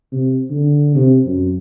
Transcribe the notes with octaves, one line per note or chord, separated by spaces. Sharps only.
C3
D3
C3
F#2